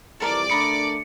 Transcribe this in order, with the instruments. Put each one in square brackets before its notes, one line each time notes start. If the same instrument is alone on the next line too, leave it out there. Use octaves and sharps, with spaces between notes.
[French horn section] F2 E3 G3 [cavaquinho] A4 A#4 [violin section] D5 D6
[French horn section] D3 A3 D4 [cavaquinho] A#4 B5 D#6 [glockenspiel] C#7